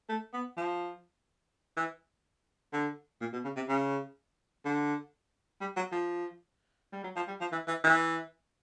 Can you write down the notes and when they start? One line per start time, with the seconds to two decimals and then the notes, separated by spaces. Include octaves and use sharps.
0.09 A3
0.33 B3
0.57 F3
1.77 E3
2.73 D3
3.21 A#2
3.33 B2
3.44 C#3
3.56 C3
3.68 C#3
4.65 D3
5.61 G3
5.76 F#3
5.92 F3
6.92 G3
7.04 F#3
7.16 F3
7.28 G3
7.40 F3
7.52 E3
7.68 E3
7.84 E3